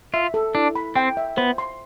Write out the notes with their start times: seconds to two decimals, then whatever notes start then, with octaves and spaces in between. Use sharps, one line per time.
0.14 F4 E5
0.34 A4
0.55 D4 E4
0.75 B5
0.96 C4 G5
1.17 E5
1.37 B3 C5
1.58 C6